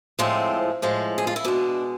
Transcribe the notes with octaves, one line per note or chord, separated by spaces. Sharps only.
A2 F3 G#3 C4
A2 F3 G#3
G#4
F4
E4
B2 G#3 D4